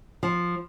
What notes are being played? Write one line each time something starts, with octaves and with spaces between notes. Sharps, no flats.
F3